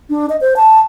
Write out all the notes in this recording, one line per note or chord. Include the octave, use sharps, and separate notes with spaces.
D4
D#5
C5
A5